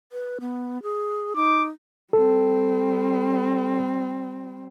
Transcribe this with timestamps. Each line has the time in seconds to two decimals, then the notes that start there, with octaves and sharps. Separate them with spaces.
0.12 B4
0.41 B3
0.83 G#4
1.36 D#4 D6
2.13 G3 C4 A4